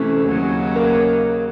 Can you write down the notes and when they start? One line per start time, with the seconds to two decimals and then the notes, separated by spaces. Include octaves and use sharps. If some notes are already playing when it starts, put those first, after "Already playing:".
Already playing: C3 E3 A3 C#4
0.28 D#2 C#3 F#3
0.76 A#3